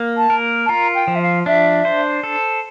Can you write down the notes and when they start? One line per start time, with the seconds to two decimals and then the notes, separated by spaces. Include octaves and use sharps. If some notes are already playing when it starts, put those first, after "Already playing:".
Already playing: A#3
0.17 A5
0.30 A#4
0.65 A5
0.69 F4 A#5
0.94 G5
1.08 F3
1.15 E5
1.21 F5
1.46 D4 E5
1.85 C5
2.23 A4